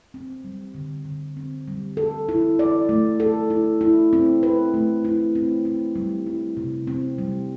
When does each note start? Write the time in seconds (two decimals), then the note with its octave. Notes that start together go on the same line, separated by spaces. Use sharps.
0.14 C4
0.44 G3
0.74 D3
1.05 D3
1.37 C4
1.68 G3
1.97 A4
2.29 E4
2.59 D5
2.89 A3
3.20 A4
3.50 E4
3.81 E4
4.13 C4
4.43 B4
4.74 A3
5.05 E4
5.35 C4
5.65 C4
5.96 G3
6.26 E4
6.57 C3
6.87 C4
7.18 G3